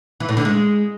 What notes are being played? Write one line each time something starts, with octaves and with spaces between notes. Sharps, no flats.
E3
A2
D3
G#3